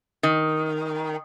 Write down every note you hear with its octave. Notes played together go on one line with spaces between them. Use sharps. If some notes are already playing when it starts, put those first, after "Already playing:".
D#3